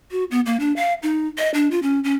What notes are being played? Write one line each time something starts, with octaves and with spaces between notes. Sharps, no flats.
F#4
B3
A#3
D4
F5
D#4
D#5
D4
F4
C#4
C#4